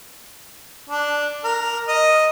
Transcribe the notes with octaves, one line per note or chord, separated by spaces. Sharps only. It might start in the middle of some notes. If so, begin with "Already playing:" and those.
D4
A#4
D#5